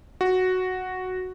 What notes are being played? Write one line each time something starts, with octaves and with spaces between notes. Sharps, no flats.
F#4